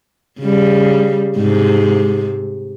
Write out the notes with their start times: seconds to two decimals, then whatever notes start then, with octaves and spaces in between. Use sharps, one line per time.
0.40 C#3 G3
1.36 G#2 C3